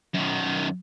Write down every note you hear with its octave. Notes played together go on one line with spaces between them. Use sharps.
F#2 D#3